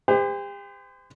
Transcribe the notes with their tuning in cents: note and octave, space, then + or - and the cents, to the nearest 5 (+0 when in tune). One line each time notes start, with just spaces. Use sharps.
G4 +40 C5 -35